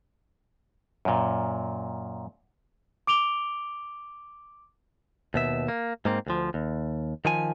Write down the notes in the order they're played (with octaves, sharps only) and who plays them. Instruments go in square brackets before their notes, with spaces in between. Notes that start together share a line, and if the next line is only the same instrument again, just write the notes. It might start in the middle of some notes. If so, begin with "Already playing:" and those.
[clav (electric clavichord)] F#2 A#2
[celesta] D6 D7 F7 G7
[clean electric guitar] D#2 B2 E5
A#3
G#2 A#3 C4
D2 F3
D#2
D#3 F3 G#5